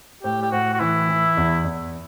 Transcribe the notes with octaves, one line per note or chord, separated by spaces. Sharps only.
A2 G4
G4
A2 F#4
F#4
E3 E4
E3
E2
E2